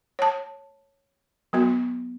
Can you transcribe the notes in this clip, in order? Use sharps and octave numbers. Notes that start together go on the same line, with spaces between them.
C#5 A5
F#3 B3 F#4